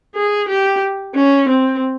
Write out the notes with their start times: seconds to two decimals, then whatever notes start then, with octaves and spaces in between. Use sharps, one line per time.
0.15 G#4
0.49 G4
1.15 C#4
1.48 C4